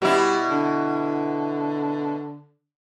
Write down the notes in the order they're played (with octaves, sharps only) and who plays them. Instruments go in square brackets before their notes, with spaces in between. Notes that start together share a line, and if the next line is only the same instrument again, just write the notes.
[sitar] B2 E4 [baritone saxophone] G3
[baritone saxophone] D3